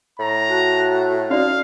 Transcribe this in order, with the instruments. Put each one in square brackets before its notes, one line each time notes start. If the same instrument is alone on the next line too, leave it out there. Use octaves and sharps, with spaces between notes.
[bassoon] A2 [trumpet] A#5
[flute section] F#4 A5 F#6
[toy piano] C#4 F#4 D5 [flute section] D#4 [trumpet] F5